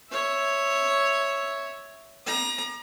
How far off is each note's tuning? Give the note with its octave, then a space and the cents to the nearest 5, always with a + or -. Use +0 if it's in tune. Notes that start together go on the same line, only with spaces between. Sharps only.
C#5 +0 E5 +0
A#5 +30 D6 +45